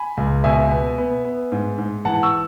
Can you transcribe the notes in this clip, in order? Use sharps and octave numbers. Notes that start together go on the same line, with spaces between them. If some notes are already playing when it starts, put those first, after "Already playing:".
Already playing: G#5 B5
C#2
B2 E5 G#5
B3
B3
B3
G#2
G#2
E3 F#5 A5
C#6 E6